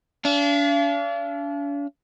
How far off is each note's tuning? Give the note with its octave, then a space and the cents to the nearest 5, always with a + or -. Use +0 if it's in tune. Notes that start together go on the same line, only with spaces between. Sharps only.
D4 -40 F5 -40